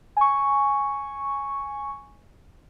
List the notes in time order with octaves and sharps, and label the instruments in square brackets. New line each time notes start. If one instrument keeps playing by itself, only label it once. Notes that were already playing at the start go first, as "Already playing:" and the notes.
[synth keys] G#5 C#6